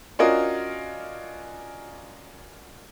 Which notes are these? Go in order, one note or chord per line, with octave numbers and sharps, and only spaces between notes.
C#4 D4 F4 F#4 A#4 D#5